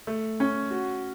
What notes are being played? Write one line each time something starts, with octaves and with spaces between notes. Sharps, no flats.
A3
C#4
F#4